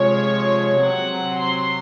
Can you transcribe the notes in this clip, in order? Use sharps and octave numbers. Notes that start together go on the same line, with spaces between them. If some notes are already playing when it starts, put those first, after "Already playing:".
Already playing: C3 F3 G#3 C#5
C3 F#3 C4 F#5
C6